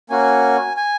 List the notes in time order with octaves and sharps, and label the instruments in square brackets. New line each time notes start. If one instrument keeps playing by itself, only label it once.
[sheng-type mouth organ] A#3 C#4 F#4 G#5
G#5